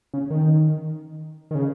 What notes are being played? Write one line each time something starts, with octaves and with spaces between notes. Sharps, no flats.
C#3
D#3
D#3
C#3